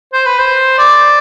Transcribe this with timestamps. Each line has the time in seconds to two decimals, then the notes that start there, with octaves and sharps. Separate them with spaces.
0.13 C5
0.26 B4
0.38 C5
0.78 D5